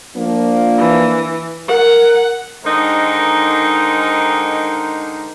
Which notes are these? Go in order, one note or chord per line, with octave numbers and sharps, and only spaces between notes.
F3 A#3 D4
E3
A#4 F#5
D3 D#3 G#3 D#4 A#4 C5